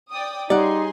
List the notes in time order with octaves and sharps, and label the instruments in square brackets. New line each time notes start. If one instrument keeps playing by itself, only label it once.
[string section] D5 G5 D#6
[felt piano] G3 [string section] C#4 G#4 C6 [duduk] D#4 [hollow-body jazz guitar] D5 F#5